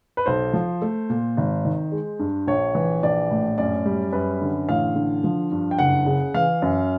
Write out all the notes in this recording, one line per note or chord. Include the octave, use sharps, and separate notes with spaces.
B4
B1 C5
F3
A3
A#2
G#1
D#3
G#3
G2
A#1 C#5
E3
A#1 D5
A2
F#2 D5
G3
F#2 B4
D3
A1 F5
D3
F3
G2
G5
F#1 F#5
C#3
E3 F5
F#2